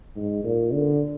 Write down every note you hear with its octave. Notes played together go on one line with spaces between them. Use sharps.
G#2
A#2
D3